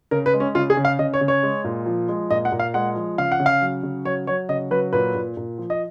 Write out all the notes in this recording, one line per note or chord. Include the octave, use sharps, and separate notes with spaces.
C#3 A#4
B4
G#3
C#4
C#3 F4
G#4
C#3
F5
C#3 D#5
C#5
C#3
C#5
G#3
A#2
F3
G#3
A#2 D#5
F#5
A#2
F5
G#3 F#5
F3
C#3 F5
F#5
C#3
F5
F#3
C#3
F#3 C#5
F#3 C#5
C#3 D#5
F#3 B4
A#2 B4
A#2
A#2
F3
D#5